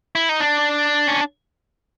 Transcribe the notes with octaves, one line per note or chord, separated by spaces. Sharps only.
E4
D#4
D4
C#4